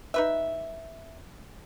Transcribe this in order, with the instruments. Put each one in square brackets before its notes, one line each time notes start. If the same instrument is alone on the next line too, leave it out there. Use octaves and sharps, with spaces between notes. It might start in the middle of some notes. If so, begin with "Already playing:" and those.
[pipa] D#4 B4 E5